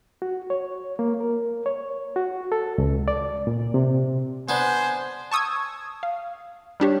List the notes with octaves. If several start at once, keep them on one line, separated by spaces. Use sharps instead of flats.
F#4
C#5
A#3
A#4
C#5
F#4
A4
C#2
D5
A#2
C3
B3 D4 C5 G#5
A5 C#6 D#6 E6 G#6
F5
G3 D4 G4 C#5